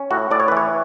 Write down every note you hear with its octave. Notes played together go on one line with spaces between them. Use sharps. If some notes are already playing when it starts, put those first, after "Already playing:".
Already playing: C#4
A2 F#4
A2 D5
C#5
B4
E3 C#5